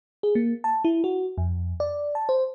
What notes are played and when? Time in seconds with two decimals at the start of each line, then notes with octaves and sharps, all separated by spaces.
0.23 G#4
0.35 A#3
0.64 A5
0.85 E4
1.04 F#4
1.38 F2
1.80 D5
2.15 A5
2.29 C5